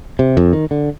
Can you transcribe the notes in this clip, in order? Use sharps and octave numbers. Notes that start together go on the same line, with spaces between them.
C3
F2
D#3
D3